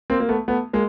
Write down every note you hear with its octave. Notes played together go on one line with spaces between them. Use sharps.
A#3 C4
A#3
A3 B3
A3 B3
G#3 A#3